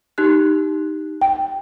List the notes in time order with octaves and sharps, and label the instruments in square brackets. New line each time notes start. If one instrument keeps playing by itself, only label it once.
[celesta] D#4 G4 F#6
[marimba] G5